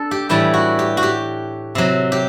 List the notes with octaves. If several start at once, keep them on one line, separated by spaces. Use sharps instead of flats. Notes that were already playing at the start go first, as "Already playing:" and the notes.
Already playing: D4 A4
G4
A2 E3 G3 G4
F#4
G4
F#4
G4
C3 F#3
G4